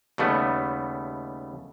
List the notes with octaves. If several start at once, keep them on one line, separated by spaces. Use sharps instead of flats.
D#2 C#3 G3 A3 B3